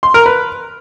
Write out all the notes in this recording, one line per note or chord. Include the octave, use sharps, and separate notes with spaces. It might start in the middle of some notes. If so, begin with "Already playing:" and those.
C6
A#4
B4